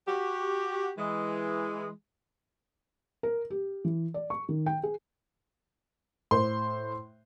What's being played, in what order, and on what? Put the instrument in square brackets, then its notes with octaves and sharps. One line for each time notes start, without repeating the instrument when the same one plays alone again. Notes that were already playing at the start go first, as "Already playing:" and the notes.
[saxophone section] F#4 G4
E3 G#3
[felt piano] A#4
G4
E3
D5
C#6
D#3
G5
G#4
[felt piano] A2 C5 [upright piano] C6